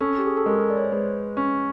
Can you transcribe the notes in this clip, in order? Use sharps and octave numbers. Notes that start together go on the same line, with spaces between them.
C#4 A4
G4
G#4
A4
G#3 A#4
D5
C#5
C5
G#3 B4
C#4